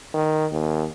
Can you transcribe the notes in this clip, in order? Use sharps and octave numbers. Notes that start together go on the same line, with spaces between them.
D#3
D#2